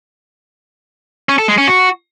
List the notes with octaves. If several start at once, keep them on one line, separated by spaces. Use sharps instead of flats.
C#4
A4
G#3
C#4
F#4